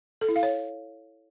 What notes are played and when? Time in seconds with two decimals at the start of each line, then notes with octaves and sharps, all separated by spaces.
0.21 A4
0.29 E4
0.36 F5
0.43 C#5